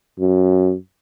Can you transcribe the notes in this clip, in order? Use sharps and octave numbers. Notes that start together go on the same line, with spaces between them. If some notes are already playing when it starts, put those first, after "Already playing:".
F#2